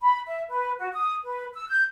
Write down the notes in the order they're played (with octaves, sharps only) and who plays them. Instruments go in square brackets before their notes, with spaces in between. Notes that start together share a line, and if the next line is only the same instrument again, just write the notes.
[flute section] B5
E5
B4
F#4
D#6
B4
E6
G6